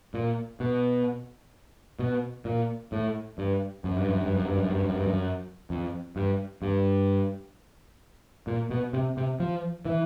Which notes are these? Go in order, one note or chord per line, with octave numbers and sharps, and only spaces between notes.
A#2
B2
B2
A#2
A2
G2
F#2
G2
F#2
G2
F#2
G2
F#2
G2
F#2
G2
F#2
F2
G2
G2
A#2
B2
C3
C3
F3
E3